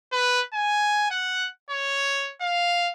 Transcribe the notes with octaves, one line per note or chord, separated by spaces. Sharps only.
B4
G#5
F#5
C#5
F5